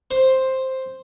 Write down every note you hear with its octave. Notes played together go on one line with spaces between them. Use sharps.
C5